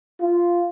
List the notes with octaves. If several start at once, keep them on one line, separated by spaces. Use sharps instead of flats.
F4